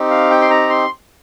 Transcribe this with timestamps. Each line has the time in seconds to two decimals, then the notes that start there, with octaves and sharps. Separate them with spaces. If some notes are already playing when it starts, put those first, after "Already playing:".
Already playing: C4 D#4 G4
0.10 F5
0.30 G5
0.42 C6
0.50 A#5
0.69 C6